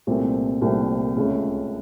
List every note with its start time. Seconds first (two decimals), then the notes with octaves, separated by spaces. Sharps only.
0.07 C2 A#2 A3 C4
0.62 C2 A#2 A3 C4
1.16 C#2 C#3 A3 C#4